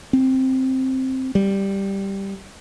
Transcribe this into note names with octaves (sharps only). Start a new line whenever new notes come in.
C4
G3